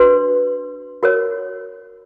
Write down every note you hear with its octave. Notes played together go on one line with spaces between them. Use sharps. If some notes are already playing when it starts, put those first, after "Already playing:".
Already playing: D4 F#4 B4 C6
F#4 A#4 C#5